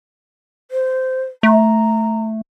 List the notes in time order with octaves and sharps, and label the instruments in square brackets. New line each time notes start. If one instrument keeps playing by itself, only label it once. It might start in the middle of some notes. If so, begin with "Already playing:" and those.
[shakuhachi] C5
[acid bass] A3 [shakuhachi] A#5